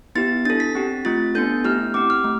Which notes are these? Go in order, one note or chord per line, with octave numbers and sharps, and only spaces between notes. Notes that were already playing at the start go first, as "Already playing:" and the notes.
B3 E4 G4 A6
D4 A4 A6
B6
C4 G4
A3 C4 F4 A6
B3 D4 A4 G6
A3 E4 G4 F6
C4 G4 D6
F6
A3